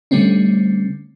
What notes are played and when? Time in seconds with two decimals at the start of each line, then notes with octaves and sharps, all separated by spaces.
0.11 D3 G3 A3 C4 C#4